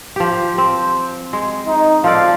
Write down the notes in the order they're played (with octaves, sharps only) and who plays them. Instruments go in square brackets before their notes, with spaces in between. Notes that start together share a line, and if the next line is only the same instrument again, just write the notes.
[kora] F3 G4
C4
G#3
[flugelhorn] D#4
[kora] F3 A4 D5 [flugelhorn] F5